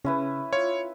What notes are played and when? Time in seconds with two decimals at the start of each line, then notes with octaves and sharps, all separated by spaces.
0.04 C#3 C#4 E4 B4
0.53 F4 C#5